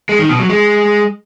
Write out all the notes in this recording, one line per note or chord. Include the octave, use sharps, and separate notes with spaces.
G#3
D#3
B2
F#3
G#3